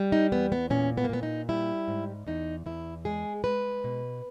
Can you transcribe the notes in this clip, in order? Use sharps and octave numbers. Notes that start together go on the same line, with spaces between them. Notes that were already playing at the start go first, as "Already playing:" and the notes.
Already playing: G3
D#4
E2 B3
B3
A#2 C#4
B3
A#3
A#2 B3
D#4
G3 E4
G#2
E2 D#4
E2 E4
G#3 G#4
G#3 B4
B2